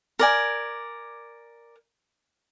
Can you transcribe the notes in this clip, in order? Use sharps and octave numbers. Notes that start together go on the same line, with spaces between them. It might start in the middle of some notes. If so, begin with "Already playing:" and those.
A#4 D5 G#5